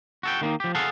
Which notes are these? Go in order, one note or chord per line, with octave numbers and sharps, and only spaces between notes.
F#4 A4 G5
D#3 A#3 C#4 D#4
F3 G4
G#4 A4 F5 F#5 A5